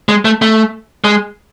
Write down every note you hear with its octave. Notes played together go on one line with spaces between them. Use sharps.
G#3
A3
A3
G#3